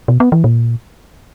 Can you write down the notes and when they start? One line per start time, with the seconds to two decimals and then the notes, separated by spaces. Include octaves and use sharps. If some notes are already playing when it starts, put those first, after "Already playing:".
0.08 B2
0.20 B3
0.32 E3
0.44 A#2